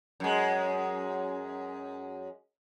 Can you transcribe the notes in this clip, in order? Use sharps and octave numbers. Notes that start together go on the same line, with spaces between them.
F#2 G#3